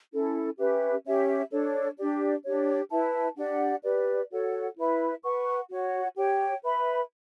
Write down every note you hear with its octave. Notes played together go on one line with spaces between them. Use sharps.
C#4 E4 A4
C#4 G4 B4 E5
C#4 G4 C#5 E5
D4 A4 C#5
D4 G4 D5
D4 G4 C#5
E4 B4 E5 A5
D4 G4 D5 F#5
G4 B4 D5
F#4 A4 C#5 F#5
E4 B4 E5 B5
B4 F#5 C#6
F#4 C#5 F#5
G4 C#5 G5
B4 E5 B5